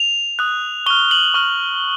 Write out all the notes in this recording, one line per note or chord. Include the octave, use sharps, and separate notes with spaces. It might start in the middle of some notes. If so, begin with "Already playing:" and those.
Already playing: F7
D#6 F#6
C#6 F6 G7
F#7
C#6 F6